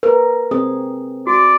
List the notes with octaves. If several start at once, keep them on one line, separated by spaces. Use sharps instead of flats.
A#4 B4
C4 G#4 D#6
F#4 D5